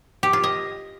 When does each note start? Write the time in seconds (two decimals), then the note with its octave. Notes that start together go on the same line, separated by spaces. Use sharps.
0.23 G4
0.33 F4
0.44 D#5